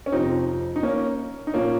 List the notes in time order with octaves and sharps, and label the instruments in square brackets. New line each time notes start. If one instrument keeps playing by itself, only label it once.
[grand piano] C#4
F2 C3 F3 C4 D#4
D#4
A#3 C#4
D#4
A#2 F3 A#3 C#4